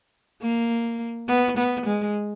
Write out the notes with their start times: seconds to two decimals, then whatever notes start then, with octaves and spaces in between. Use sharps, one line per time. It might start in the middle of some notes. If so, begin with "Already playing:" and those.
0.42 A#3
1.28 B3
1.57 B3
1.86 G#3